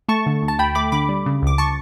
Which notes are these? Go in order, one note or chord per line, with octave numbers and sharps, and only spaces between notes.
A3 A5 C#6
D3
D2
A5
D2 G5 B5
A3 B5 D6
D3 B5 D6
G3
C#3
C#2 D6
A5 C#6